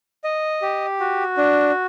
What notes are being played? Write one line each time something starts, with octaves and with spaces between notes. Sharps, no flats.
D#5
G4
F#4
D4